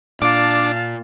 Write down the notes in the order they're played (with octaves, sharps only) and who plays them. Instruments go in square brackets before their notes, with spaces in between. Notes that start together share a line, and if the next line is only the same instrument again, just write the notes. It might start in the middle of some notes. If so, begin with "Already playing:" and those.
[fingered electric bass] A#2 [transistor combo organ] D4 [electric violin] F5 A5 [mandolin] D6